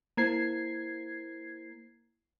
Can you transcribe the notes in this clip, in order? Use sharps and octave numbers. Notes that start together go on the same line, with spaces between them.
A#3 E4 C5 A#5 G#6 C7